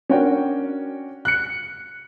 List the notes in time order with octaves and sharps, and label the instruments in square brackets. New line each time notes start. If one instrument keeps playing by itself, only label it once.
[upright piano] C#4 D4 F#4 A#4 C#5 G5
F#6 C#7